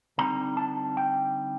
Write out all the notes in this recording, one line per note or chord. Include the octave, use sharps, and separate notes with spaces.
D3 G3 C4 D#4 A#5
A5
G5